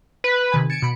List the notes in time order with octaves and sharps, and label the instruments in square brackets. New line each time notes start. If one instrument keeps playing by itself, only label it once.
[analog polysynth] B4
[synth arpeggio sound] C3 D#3 G#5
[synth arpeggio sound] G#6 A6 E7 [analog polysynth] C#7 D7
[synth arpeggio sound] B2 B5